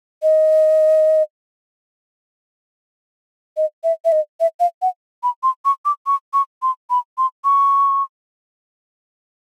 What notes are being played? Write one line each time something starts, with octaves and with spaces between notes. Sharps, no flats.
D#5
D#5
E5
E5
D#5
E5
F5
F#5
B5
C6
C#6
D6
C#6
C#6
C6
B5
C6
C#6